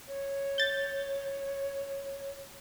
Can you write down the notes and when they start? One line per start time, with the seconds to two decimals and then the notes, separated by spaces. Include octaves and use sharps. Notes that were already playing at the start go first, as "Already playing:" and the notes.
0.08 C#5
0.58 G6 A6